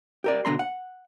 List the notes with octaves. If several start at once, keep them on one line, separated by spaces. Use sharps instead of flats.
G4 A#4 D5
B2 D3 G#3 A#5 C6
F#5